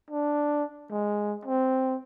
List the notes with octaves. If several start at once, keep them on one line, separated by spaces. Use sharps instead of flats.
D4
G#3
C4